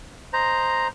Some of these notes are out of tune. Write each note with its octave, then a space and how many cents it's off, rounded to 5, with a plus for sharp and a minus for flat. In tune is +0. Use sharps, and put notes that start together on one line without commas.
C5 +0 D#5 -5 A#5 +0